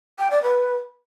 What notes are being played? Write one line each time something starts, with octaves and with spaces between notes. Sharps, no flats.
G5
D5
B4